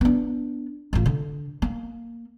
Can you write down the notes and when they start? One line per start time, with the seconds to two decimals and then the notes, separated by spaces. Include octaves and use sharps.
0.01 B3 D4
0.93 A1 F4
1.06 D3
1.62 A#3